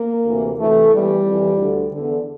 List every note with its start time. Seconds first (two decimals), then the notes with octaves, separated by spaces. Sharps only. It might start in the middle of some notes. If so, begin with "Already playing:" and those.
Already playing: A#3
0.25 D2 C3 E3
0.58 D2 C3 E3 A3
0.92 E2 E3 G3
1.25 F2 E3
1.59 D2 D3
1.91 E2 D3